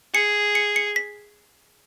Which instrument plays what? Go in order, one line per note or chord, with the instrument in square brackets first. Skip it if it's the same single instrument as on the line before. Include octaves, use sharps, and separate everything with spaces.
[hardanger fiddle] G#4 [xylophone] C#7
[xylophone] C#7
C#7
B6